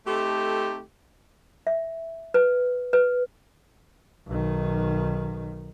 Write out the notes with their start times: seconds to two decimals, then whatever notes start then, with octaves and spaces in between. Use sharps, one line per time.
0.06 A3 C4 D#4 G4 A4
1.67 E5
2.34 B4
2.93 B4
4.27 B1 D#3